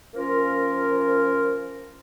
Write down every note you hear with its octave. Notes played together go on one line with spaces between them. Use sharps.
F3 A#3 C#4 F4 A#4